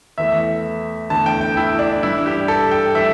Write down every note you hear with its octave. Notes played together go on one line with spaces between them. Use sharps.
E2 E3 A3 E5
E2 D3 A3 A5
G5
G5
E4
D4
G2 E3 G3 E4
G4
A4
G5
E3 A3 E5